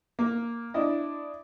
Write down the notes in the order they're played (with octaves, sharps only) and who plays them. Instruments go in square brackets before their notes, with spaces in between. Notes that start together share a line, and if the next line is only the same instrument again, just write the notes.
[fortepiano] A#3
D4 E4 D#5